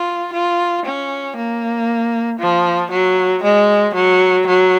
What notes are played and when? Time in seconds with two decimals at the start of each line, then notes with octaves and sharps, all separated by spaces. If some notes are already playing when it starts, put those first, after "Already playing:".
Already playing: F4
0.33 F4
0.86 C#4
1.37 A#3
2.39 F3
2.91 F#3
3.43 G#3
3.95 F#3
4.47 F#3